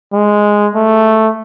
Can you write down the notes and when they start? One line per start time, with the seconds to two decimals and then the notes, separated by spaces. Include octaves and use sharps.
0.13 G#3
0.75 A3